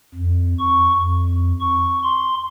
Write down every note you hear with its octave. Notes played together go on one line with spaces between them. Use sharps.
F2
C#6
F2
C#6
C6